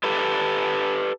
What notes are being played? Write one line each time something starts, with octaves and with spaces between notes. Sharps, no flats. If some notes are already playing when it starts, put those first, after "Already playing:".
G4 A4 B4